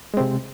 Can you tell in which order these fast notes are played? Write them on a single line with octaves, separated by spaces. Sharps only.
G#3 C4 C3